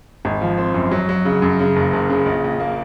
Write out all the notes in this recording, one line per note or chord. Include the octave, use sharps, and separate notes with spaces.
G#1
F3
C4
F#2
F#3
F#3
C#3
F#2
C#3
F#1
F#1
C#3
A#1
A#1
A#3